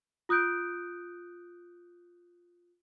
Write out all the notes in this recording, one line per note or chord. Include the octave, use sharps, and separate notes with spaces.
F4 D#6 F#6 G6 D7